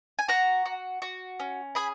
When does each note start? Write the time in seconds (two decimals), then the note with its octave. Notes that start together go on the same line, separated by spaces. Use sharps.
0.19 G#5
0.28 F#4 F#5 A#5
0.66 F#4
1.02 F#4
1.40 C#4
1.75 G#4 G#5 B5